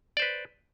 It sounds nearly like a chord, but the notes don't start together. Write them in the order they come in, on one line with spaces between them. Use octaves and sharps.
D5 C5 B4